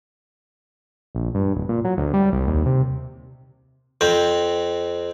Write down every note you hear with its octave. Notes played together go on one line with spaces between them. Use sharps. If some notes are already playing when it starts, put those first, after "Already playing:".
A#1
G2
D1
A#2
F#3
D2
G3
C2
D#2
C3
F2 C4